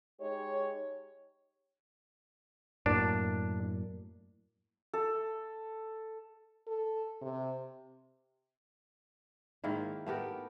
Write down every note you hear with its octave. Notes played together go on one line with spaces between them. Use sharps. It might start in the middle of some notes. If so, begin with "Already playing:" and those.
G#3 D#4 G4 C#5
F#2 A2 A#3 D4
A4
A4
C3
G#2 D#3 A#3 E4
A3 B3 G4 A#4